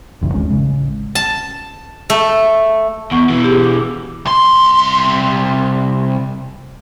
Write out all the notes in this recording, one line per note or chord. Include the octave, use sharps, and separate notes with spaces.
F#1 C#2 G2 E3
D#2 D#3 G#3 C#4
A1 C#3 G#3
A5
A3
E2 B3 F#5 C#6
B2 E3
G4 G#4
D6
C2 C6